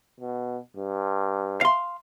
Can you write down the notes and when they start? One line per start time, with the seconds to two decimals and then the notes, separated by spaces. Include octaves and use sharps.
0.21 B2
0.77 G2
1.61 F5 C6